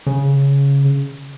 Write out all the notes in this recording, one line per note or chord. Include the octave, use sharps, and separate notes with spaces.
C#3